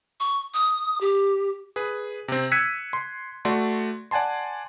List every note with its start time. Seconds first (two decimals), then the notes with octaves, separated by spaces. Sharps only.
0.20 C#6
0.54 D#6
1.01 G4
1.76 G#4 B4
2.28 C3 C4
2.52 E6 F#6 G#6 B6 C#7 D#7
2.93 C6
3.45 A3 F#4 D5 C6
4.11 D5 F#5 G#5 A5 C6